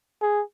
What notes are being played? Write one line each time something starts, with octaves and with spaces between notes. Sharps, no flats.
G#4